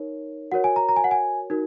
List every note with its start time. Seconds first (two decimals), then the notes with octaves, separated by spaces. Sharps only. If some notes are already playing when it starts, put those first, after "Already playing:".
Already playing: D#4 A#4 C#5
0.52 F#4 A#4 C#5 F#5
0.64 G#5
0.76 A#5
0.89 A#5
0.96 G#5
1.04 F#5
1.11 G#5
1.50 D#4 F#4 A#4